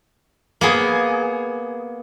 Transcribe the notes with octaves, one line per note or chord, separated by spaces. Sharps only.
A#3 B3 G#4